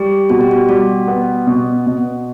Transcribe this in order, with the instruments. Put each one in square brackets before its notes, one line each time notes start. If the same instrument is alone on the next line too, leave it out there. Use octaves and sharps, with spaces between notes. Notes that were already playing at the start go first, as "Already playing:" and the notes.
Already playing: [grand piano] G3 [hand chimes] G4
[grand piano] B2 [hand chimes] F#4
[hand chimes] G4
F#4
[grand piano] G3 [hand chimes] F#4
[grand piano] B3
B2
B2